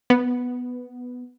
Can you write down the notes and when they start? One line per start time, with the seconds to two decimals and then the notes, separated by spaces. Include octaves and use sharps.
0.10 B3